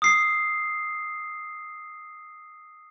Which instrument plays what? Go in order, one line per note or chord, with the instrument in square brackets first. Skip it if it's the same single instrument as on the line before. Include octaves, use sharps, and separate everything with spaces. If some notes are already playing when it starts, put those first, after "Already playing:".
[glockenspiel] D#6 E6 C7